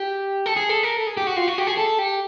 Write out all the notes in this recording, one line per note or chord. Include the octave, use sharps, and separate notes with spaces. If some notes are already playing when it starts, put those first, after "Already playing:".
Already playing: G4
A4
G#4
A4
A#4
A4
G#4
G4
F#4
F4
F#4
G4
G#4
A4
G4